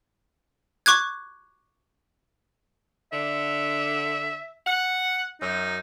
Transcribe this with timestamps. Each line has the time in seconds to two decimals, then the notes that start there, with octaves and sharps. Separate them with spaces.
0.86 C#6 D6 F#6 G#6
3.13 D3 E5
4.66 F#5
5.41 F#2 D#4